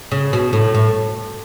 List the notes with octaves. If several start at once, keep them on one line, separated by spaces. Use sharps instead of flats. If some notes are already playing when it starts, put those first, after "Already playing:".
C#3
B2
A2
A2